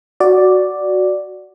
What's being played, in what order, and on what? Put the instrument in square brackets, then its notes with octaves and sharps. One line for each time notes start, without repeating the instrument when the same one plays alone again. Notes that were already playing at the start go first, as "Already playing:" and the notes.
[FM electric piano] F#4 D5